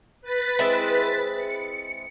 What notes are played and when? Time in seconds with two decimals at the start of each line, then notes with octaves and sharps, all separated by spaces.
0.22 B4 A6 B6
0.59 G#3 C4 E4
1.37 C#7